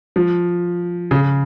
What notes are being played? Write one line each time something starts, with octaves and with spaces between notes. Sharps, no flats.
F3
C#3